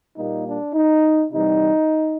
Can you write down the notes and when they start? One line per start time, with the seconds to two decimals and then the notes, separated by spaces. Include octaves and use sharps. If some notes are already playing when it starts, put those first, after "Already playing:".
0.17 A#2 G3 A#3 D#4
0.46 D4
0.74 D#4
1.31 C3 E3 G3 D#4